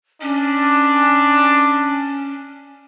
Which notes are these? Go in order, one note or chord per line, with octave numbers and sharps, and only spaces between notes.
C#4 D4